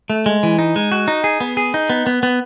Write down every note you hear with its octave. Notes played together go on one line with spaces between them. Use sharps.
A3
G#3
E3
D#4
G#3
F#4
D#4
G#4
B3
G#4
D#4
B3
B3
B3